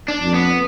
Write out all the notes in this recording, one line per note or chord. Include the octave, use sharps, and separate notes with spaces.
D4
F2
B3